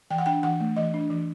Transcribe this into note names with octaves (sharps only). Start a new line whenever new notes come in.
E3 G5
F#5
D4 G5
E3 F#5
A3
E3 D#5
D4
E3